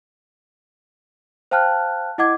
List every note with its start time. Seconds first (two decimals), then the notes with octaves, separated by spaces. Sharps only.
1.51 C5 F5 G5 A5 F6 F#6
2.18 E4 D#5 F#5 D6 G#6